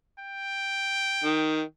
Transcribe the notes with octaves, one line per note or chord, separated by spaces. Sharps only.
G5
D#3